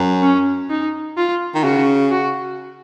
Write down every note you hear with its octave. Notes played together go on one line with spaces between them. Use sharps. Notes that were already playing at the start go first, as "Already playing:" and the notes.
Already playing: F#2
C#4
D#4
F4
D#3
C#3 F#4
F#4